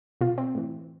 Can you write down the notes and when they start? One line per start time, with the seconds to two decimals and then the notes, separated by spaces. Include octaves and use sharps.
0.21 B2 F4
0.38 C4
0.55 A2 E3